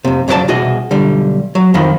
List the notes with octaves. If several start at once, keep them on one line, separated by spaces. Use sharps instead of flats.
F2 C3
F2 C#3 F#3 F4 D5 A5
C2 B2 F#4 G#4 D#5
B1 D3 G3
F#3
F2 D#3 F3 D#5 B5